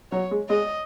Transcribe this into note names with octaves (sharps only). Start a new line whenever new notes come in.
F#3 C#5
G#3
G#3 D#5